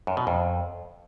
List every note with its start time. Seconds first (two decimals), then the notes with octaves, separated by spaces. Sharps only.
0.07 F#2
0.17 B2
0.27 F2